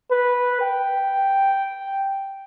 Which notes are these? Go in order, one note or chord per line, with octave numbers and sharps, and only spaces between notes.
B4
G5